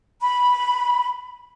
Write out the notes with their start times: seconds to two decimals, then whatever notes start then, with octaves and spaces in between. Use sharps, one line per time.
0.22 B5